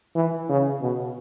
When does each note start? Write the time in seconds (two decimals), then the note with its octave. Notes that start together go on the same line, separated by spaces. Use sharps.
0.15 E3
0.49 C#3
0.81 B2